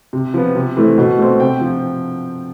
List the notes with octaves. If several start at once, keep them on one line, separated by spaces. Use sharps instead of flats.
C3
F3 B3
C3
E3 A3 C4
B2
A3 C4
C3 G5
F3